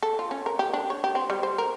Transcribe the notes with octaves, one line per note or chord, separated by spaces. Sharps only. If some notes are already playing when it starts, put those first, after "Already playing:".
A4
F4
C#4
A#4
G4
D4
C#5
G4
C4
G3
C5
A#4